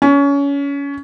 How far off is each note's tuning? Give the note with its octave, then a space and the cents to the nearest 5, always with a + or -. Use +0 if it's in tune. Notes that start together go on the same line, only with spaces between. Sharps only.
C#4 +25